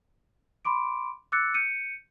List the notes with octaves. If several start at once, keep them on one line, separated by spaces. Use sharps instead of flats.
B5 C6 D6 D7
D6 E6 F#6 A6 C#7
G6 C#7 D#7